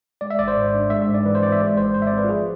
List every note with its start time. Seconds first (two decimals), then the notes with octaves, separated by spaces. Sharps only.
0.21 G#3 D5
0.30 E5
0.39 G#1 D5
0.48 C5
0.57 G#2
0.74 D4
0.90 G#3 E5
1.02 E5
1.08 G#2
1.14 D5
1.26 E3 B4
1.35 C5
1.43 C4 D5
1.52 E5
1.60 G#3 D5
1.77 G#1 C5
1.94 G#2 C5
2.02 E5
2.07 D5
2.12 C4
2.18 B4
2.24 F4
2.29 F3 G#4